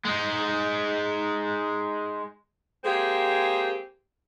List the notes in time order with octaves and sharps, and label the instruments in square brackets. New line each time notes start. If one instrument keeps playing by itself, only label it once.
[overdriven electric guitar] G#3 D#4
[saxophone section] G#3 A#3 C4 G4 G#4